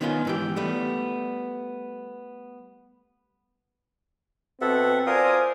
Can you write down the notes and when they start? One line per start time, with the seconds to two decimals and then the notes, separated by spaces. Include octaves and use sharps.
0.01 D#3 B3 C#4 E4 F4
0.25 G#2 E3 G4
0.56 G3 A3 B3
4.61 B2 C4 A4 E5 F#5
5.07 F4 A#4 C5 D5 G#5 D#6